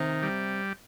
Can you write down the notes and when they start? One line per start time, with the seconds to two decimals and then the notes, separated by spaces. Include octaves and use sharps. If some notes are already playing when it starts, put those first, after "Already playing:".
Already playing: C3 D#3
0.22 G3